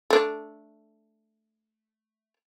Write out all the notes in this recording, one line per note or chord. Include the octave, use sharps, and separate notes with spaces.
A3 D4